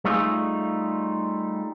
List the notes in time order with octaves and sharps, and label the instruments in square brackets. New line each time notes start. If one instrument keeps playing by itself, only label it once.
[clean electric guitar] G3 A3 D#4 F4 G#4